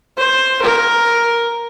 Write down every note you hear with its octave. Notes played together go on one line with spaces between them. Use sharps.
C5
A#4